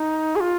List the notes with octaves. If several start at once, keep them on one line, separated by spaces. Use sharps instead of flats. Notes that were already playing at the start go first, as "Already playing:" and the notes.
Already playing: D#4
G#4
F4